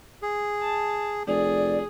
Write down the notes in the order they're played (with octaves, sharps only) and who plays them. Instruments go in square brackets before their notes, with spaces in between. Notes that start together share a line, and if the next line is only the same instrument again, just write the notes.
[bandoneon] G#4
[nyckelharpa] A5
[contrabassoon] F1 [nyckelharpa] G#4 [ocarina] D5